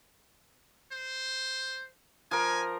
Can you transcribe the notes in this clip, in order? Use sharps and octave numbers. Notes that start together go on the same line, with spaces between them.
C5
F3 A#4 G#5